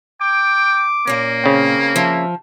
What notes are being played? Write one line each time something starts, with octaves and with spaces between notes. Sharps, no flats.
G5 D6
A#2 A#3 C#4
C#3 C4
F3 E5